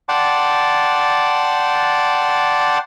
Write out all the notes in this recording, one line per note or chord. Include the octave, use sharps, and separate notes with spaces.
D5 F#5 G5 A5 C6 D6